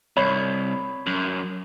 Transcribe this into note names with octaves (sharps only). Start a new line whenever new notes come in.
C2 C#5 B5
F#2